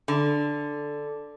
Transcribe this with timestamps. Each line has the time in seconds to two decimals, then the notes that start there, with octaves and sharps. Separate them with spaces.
0.08 D3